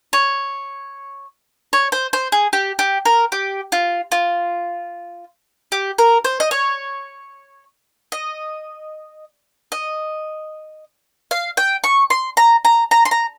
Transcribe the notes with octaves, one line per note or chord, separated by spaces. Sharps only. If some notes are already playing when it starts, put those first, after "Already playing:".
C#5
C#5
C5
C5
G#4
G4
G4
A#4
G4
F4
F4
G4
A#4
C5
D#5
C#5
D#5
D#5
F5
G5
C#6
C6
A#5
A#5
A#5
C6
A#5